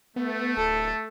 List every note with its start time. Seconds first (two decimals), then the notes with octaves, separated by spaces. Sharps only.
0.16 A3 B3
0.57 D1 A4